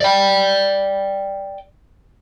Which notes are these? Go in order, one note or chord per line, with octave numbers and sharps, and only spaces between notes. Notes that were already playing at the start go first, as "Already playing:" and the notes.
D5 G5